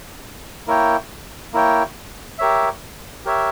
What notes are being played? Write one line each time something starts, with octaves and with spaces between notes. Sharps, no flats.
A#3 E4 A#4 C#5 G5
A#3 E4 A#4 C#5 G5
G4 A#4 C#5 E5
G4 A#4 C#5 E5